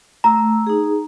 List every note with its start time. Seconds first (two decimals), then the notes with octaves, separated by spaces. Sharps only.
0.24 A3 A#5 E6
0.67 D#4 G#4